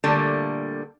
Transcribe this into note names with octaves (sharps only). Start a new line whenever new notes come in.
A#2 D3 G3 A3 A#3